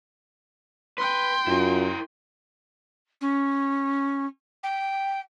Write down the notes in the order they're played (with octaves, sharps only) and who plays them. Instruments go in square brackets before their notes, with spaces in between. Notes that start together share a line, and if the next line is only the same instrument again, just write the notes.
[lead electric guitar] B4 [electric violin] G5 C6
[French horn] F#2 [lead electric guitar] E4 A#4 [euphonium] F4
[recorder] C#4
G5